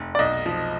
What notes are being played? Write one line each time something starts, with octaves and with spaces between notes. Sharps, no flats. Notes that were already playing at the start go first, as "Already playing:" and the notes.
Already playing: F1
D5
B1 D#5
F3